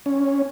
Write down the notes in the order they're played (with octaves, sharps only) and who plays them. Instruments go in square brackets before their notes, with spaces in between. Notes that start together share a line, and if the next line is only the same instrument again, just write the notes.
[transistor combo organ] C#4